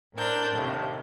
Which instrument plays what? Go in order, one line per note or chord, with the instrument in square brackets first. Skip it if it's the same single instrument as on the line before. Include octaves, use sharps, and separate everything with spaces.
[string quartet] A2 D4 G6 [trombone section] C4 A#4
[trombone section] D#2 A2 [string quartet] C3